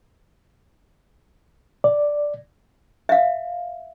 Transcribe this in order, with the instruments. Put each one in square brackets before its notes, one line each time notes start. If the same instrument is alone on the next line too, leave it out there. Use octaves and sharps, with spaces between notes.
[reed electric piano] D5
[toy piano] E5 F5